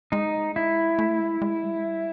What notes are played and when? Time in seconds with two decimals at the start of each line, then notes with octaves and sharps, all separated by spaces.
0.12 G#3 D#4
0.56 E4
0.99 A3
1.20 G#3
1.42 G#3
1.63 G3
1.76 G#3
1.84 G3